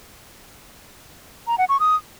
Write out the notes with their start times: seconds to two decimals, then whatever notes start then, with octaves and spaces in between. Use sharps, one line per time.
1.47 A#5
1.58 F#5
1.69 C#6
1.80 D#6